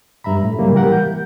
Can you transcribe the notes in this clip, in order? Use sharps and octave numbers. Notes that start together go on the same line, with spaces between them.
G2 E5 A#5 B5
A2
C#3 F#3 G3 A#3
E3 G3 G4 A#4 F#5
G6